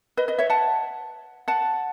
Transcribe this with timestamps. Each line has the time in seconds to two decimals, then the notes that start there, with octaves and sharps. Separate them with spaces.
0.17 B4 D#5
0.28 B4 D#5
0.38 C#5 E5
0.50 F#5 A5
1.48 F#5 A5